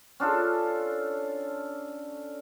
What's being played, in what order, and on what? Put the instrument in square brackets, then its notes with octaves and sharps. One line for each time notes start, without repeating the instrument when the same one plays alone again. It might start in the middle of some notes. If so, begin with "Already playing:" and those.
[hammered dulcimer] C#4 D4 F4 A4